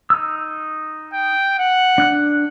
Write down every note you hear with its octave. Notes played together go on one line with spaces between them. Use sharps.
D#4 E6
G5
F#5
D4 F#6